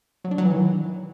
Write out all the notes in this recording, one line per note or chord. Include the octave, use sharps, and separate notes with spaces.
F#3
D4
F#3
E3
D#3